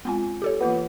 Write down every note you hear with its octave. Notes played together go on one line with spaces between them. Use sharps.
G#3 B3 C4 F4 G#5
G4 A4 C#5
E3 A#3 B3 F4